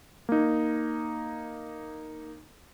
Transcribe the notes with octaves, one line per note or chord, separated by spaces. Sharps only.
A#3 D#4